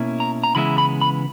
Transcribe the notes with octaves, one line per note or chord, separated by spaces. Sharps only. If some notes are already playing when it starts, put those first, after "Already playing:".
Already playing: B2 A#3 C#4 E4
A#5
A#5
C#3 E3 G#3 B3 E4 B5
B5
B5